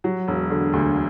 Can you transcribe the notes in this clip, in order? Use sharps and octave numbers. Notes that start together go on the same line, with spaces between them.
F#3
E1
D3
D2